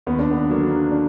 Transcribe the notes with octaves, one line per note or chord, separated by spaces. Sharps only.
D#2 B3
D4
B3
D3 F#3 A#3 D4
D4